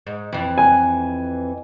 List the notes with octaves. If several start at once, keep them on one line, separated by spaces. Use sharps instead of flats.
G#2
F2 E3
G#5